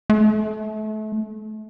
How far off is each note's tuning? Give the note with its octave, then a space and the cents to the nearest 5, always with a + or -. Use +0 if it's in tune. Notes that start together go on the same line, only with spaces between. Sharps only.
A3 -30